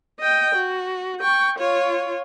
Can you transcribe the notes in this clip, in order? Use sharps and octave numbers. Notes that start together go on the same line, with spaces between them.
D#5 G5
F#4
G5 C#6
F4 C#5